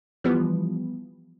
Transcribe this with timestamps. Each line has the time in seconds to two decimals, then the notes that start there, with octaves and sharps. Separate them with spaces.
0.24 E3 F3 G3 B3